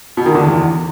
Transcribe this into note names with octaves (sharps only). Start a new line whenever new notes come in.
B2
D#3
D3
E2